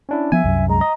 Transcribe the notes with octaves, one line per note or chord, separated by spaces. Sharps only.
C#4 D4 E4
F3 B3 E5 G#5
C2 F#2
G#3 A#5
D#5